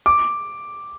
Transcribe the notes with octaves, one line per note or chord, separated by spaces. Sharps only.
D6